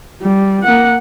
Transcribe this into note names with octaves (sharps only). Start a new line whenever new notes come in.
G3
A#3 F#5